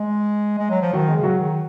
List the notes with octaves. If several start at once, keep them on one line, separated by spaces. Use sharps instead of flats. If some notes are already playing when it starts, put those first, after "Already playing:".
Already playing: G#3
G#3
F#3
F3
D#3 F#3 F#4
G#3 G#4
C#3
F#3 F#4
D#3